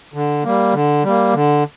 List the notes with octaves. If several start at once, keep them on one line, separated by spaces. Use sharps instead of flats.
D3
G3 A#3
D3
G3 A#3
D3